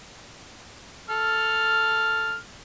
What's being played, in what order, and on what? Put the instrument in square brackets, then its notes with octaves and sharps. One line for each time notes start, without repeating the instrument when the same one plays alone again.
[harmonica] A4 F6